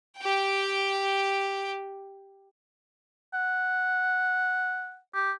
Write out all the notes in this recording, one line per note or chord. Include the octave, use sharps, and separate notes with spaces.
G4 G5
F#5
G4